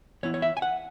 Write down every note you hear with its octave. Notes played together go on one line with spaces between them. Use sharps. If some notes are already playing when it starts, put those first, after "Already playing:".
E3 B3 E4 C#5
C#5
E5
G#5
F#5